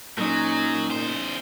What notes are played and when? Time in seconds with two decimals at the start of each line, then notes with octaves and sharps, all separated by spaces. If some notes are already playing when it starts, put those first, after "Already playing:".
0.18 A#2 F#3 C#4 D#4
0.90 E2 C5